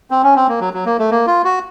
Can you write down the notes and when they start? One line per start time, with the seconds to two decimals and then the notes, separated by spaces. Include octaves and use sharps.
0.11 C4
0.23 C#4
0.36 C4
0.48 A#3
0.61 F#3
0.73 F#3
0.86 A#3
0.99 A3
1.11 A#3
1.27 F4
1.44 F#4